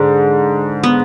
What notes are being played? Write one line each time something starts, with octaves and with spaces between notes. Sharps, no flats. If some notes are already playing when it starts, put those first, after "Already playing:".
Already playing: G#2 D3
B3